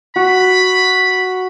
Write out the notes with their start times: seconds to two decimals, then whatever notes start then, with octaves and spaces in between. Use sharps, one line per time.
0.16 F#4 B5